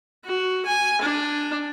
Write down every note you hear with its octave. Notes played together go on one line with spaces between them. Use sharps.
F#4
G#5
D4